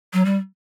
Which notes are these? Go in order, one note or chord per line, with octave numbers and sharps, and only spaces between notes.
F#3
G3